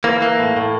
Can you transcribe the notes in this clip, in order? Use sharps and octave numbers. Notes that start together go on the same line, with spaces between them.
E3 A#3
E3 A#3
A2
A2